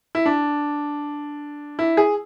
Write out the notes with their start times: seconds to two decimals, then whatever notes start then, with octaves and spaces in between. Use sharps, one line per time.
0.15 E4
0.26 D4
1.79 E4
1.97 G#4